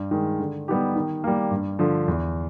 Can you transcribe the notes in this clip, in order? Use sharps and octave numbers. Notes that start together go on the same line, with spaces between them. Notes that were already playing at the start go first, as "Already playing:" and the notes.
Already playing: G2
D#3 G#3
D3
G3 B3 D#4 G4
D#3
G3 A#3
G2
D3 F3
E2